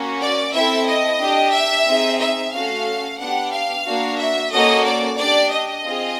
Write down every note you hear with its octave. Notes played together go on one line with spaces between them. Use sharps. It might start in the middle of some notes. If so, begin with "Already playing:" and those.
Already playing: A#3 C#4 F#4
D5
C4 E4 A4 E5
D#5
D4 G4
E5
C4 D#4 G#4
E5
A3 C#4 F#4 A4 F5
B3 D4 G4 F#5
F5
A#3 D4 F#4
E5
A#3 C#4 F#4 A4 D#5
D5
D4 G4 D5
D#5
C4 F4 G#4